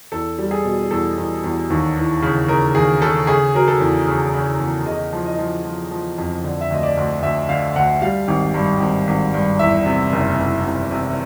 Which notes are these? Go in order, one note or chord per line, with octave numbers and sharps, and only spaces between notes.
E2 A4
G3
G#4
B2
E2 A4
E2
E2
D#2
E3
C#3
C#3 A#4
D#2 G#4
C#3 A4
C#3 G#4
F#3 A#4
A4
E2
C#3
C#3
E2
C#3 D#5
F3
D#5
F3
F3
F3
F2
D3
E5
D2 D#5
D5
D2
D2 E5
D3 F5
D2 F#5
G3 F5
G#1
G2
G#1
G#1
G2
E2 E5
C3
F#1
F#1
C3
C3